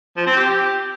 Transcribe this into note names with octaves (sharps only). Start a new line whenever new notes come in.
F3
C4
G4